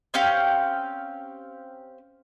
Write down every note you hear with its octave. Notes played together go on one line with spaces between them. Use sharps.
C4 C#4 G4 F5